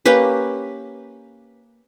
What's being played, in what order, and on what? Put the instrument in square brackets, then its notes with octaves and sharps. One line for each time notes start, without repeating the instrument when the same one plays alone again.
[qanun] A#3 C#4 G4 B4